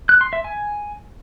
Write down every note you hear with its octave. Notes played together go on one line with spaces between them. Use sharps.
F#6
C6
E5
G#5